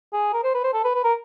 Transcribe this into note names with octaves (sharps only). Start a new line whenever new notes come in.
G#4
A#4
C5
B4
C5
A4
B4
B4
A#4